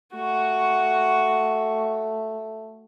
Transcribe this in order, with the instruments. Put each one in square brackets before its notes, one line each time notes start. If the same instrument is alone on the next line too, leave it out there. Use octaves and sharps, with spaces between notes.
[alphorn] A3 [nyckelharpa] F#4 C#6